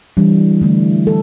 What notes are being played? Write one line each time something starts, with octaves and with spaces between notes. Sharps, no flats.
E3 G3 D4
D3 A3 E4
A4